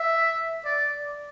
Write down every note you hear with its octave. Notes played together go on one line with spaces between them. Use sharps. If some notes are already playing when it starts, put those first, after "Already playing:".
Already playing: E5
D5